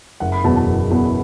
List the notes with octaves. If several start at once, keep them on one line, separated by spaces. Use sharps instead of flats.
F#1 F#5
B5
E2 B2 F#3 B3 A5
A5
F#1
E2 B2 F#3 B3